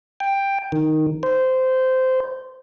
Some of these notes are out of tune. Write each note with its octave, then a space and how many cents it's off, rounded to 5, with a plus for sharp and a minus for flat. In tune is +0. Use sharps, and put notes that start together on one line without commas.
G5 +10
D#3 +0
C5 -15